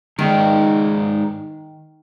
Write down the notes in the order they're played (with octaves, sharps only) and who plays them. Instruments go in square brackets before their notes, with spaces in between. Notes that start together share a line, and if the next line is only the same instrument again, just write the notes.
[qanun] D#3 [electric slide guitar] G#3 D#4 G#4 D5